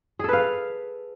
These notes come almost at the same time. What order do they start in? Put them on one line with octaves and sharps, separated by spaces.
G#4 A4 B4 F5